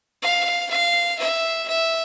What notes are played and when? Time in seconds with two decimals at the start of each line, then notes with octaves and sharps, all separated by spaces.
0.22 F5
0.70 F5
1.19 E5
1.68 E5